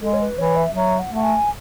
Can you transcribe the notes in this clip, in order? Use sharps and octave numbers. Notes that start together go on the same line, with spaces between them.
G#3 A4
C#5
B4
E3 C#5
E5
F#3 E5
F#5
A3
F#5
G#5